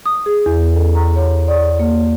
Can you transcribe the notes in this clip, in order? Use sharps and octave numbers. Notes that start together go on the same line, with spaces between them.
D#6
G#4
E2
A4
A#5
C#5
D5
A#3